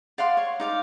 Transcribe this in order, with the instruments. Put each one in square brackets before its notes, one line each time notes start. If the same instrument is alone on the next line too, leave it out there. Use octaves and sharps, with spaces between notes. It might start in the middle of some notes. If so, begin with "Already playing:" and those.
[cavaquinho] D5 F5 F#5 C6
C#5
D#4 D5 F5